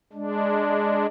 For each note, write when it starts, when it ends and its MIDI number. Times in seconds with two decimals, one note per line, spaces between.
0.13 1.06 56
0.13 1.06 62